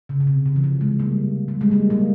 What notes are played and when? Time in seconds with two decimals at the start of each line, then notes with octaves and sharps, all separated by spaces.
0.09 C#3
0.20 C#3
0.27 C3
0.46 C#3
0.56 E3
0.64 F3
0.81 G#3
0.99 G3 A#3
1.48 G3
1.61 G#3
1.71 G3 A#3
1.90 G3 A#3